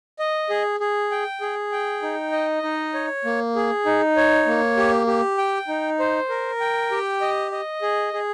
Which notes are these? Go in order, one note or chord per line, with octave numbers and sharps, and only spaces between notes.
D#5
G#4
G#4
G5
G#4
G5
D#4
D#5
D#4
C#5
A#3
G#4
D#4
C#5
A#3
G4
G4
G5
D#4
C5
A#4
G5
G4
D#5
D#5
G#4
G#4